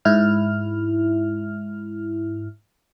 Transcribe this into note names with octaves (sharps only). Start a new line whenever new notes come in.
G#2 E4 F6